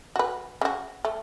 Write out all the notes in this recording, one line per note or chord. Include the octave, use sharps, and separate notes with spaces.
F#4 B4
C#3 F#4
A3